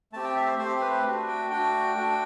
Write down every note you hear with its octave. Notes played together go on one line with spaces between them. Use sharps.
A3 C4 G4 A5
G5
E5
C5
A3 C4 G4 C5
B4
A3 D4 F#4
G5
A3 D4 F#4 G5
A3 D4 F#4